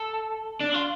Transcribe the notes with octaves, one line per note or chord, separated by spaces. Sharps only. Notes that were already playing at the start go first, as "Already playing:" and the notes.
Already playing: A4
D4
E4
F4